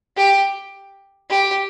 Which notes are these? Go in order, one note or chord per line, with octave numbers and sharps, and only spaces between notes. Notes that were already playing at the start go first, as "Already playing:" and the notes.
G4
G4